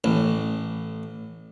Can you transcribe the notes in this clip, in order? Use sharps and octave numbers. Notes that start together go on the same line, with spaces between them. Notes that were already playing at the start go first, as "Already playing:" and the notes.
A1